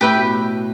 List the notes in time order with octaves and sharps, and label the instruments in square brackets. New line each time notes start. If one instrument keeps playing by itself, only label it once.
[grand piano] A2 [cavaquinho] G4 B4 E5 G5
[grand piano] B2